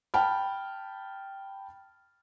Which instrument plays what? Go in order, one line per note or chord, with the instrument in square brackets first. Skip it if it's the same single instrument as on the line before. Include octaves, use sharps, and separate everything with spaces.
[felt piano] G5 A5 B5 F6